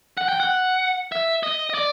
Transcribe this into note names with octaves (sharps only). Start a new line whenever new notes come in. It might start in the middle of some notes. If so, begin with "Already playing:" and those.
F#5
G5
F#5
E5
D#5
D#5
D5